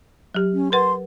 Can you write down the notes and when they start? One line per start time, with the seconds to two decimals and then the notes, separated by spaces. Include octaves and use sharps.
0.35 F#3 G4
0.54 C#4
0.72 A#4 B4 F#5 C6